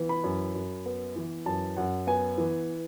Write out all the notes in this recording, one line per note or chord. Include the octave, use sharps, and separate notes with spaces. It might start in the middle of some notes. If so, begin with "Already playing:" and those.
Already playing: E3 B3
B5
F#2
F#2
B3
E3
F#2 A5
F#2 F#5
B3 G#5
E3